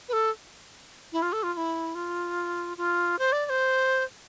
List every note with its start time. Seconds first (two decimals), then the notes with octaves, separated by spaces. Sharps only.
0.09 B4
0.13 A4
1.13 E4
1.22 F4
1.33 A4
1.43 F4
1.54 F4
1.57 E4
1.95 F4
2.77 F4
3.19 C5
3.32 D5
3.46 D5
3.50 C5